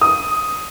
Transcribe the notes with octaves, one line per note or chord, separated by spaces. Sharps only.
D#6